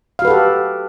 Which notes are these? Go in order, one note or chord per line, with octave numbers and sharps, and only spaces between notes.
F#4 G4 A4 B4 F5